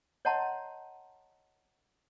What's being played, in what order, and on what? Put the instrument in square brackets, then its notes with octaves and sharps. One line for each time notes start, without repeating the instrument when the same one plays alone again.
[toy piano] C#5 D#5 F#5 A5 A#5 C6